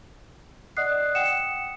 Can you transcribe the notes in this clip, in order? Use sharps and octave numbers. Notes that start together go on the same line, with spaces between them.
D5 D#5 F#5 D#6 F#6 C7
F#5 G5 D#6 C#7 E7